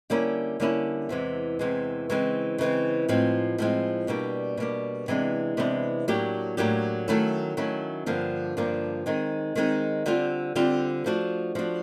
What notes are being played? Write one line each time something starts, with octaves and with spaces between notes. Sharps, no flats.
D3 G3 A#3 C#4 E4
D3 G3 A#3 C#4 E4
E2 C3 E3 G#3
E2 C3 E3 G#3
C#3 E3 G#3 C4
C#3 E3 G#3 C4
A2 F3 G#3 C4
A2 F3 G#3 C4
B2 G3 A#3 D4
B2 G3 A#3 D4
C3 E3 G#3 B3 D4
C3 E3 G#3 B3 D4
A2 F#3 A#3 D4 G4
A2 F#3 A#3 D4 G4
D#3 F#3 A3 C#4 E4
D#3 F#3 A3 C#4 E4
G2 D3 F3 A#3 D4
G2 D3 F3 A#3 D4
D#3 G#3 C4 D#4
D#3 G#3 C4 D#4
D3 G3 C4 F4
D3 G3 C4 F4
F3 A3 D4 F#4
F3 A3 D4 F#4